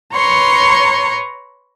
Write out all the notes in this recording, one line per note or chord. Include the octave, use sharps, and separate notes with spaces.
B4 C#5 A#5 C6 C#6